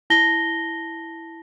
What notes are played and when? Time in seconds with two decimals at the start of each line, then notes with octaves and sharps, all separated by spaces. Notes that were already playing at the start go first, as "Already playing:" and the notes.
0.10 E4 A5 A#6 G7